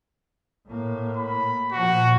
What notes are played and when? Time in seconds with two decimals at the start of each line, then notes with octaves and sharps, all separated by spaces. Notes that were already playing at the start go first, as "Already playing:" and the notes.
0.68 A2 A#3
1.16 B5
1.72 A#2 F3 F#4